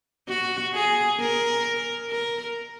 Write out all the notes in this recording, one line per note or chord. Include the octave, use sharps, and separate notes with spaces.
F#4
G#4
A#4
A#4